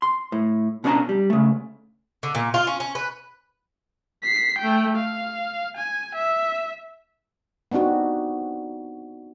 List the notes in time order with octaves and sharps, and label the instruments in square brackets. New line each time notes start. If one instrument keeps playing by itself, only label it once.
[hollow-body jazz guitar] C6
A2
B2 C#4 D4 D5 A5 A#5
G3
C#3 A3
[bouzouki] D3
A#2
F4
C#4
C#4
B4
[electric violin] B6 C7
A3 G5
F5
G#5
E5
[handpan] B3 C4 D4 D#4 F#4